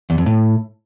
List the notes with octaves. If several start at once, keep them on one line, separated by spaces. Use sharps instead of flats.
E2
F2
A2